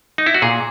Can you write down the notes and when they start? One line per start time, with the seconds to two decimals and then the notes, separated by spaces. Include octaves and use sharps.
0.18 D#4
0.26 E4
0.34 F#4
0.42 A#2 G#4